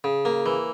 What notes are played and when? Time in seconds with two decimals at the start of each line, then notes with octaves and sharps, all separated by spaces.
0.04 C#3
0.25 A#3
0.46 E3